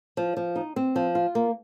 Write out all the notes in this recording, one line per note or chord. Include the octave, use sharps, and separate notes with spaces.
F3
F3
D#4
C4
F3
F4
A#3